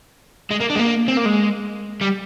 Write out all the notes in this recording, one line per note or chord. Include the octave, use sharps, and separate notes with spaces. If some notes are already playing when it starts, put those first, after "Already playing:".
G#3
A#3
D4
G#3
A#3
C4
A#3
G#3
G3